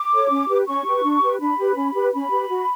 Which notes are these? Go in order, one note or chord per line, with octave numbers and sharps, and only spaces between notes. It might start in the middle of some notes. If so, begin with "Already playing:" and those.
Already playing: D6
A4 C#5
C#4
G4 B4
C#4 C#6
G4 B4
D4
G4 B4
D4 B5
G4 B4
C#4
G4 B4
C#4 B5
G4 B4
F#4